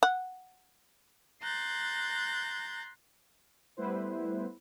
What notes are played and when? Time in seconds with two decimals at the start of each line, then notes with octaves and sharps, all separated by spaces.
0.03 F#5
1.42 A#5 C6 F#6 G6 A6
3.77 G3 A3 B3 E4 B4 C5